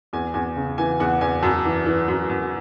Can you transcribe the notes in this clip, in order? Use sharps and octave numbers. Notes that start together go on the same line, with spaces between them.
E2 G#5
E2 G#5
C#3
E3 G#5
E2 F#5
E2 G#5
F#2 A5
E3
E3
F#2
F#2